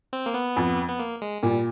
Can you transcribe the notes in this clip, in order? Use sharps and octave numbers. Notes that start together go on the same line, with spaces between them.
C4
A#3
B3
F2
B3
A#3
G#3
A#2 G3